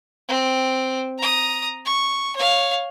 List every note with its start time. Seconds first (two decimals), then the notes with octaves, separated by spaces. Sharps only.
0.28 C4
1.18 A#5 D#6
1.85 C#6
2.36 C#5 F5